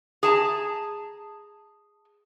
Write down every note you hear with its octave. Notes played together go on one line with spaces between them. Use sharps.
G#4 A5 A#5